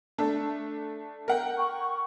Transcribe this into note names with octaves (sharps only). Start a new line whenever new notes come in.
A3 D4 A4
A#4 F#5 G5
C#6